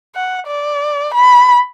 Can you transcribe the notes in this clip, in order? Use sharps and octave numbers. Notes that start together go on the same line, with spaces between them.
F#5
D5
B5